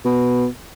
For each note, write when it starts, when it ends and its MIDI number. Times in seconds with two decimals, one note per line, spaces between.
0.05 0.47 47